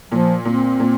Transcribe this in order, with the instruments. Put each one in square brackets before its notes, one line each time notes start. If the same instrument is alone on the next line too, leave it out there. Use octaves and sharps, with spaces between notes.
[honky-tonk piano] A#2 [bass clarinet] F3
[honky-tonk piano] A#2 [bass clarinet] C4
[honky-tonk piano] A#2